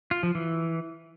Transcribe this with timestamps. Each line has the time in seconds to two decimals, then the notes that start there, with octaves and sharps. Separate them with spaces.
0.11 F4
0.23 F3
0.35 E3